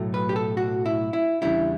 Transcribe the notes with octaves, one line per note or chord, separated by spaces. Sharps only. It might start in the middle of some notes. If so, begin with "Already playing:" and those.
Already playing: B1 A2 F#3 A3
B4
G4
A4
F#4
E4
E4
E2 C#3 G3 D4 E4